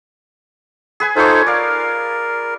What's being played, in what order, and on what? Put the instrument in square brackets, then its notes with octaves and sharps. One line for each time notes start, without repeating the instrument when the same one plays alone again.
[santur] G#4 B4 G#5
[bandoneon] D#4 A4 C5 [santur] F4 C#5
[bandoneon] A#4 [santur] D5 F5